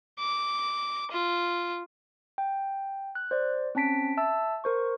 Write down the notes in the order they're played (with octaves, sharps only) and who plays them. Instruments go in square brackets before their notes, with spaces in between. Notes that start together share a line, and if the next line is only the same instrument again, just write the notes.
[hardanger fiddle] D6
F4
[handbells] G5
F#6
C5 D5
C4 C#4 A5 B6 D7
E5 A5 E6
A#4 C5 C#6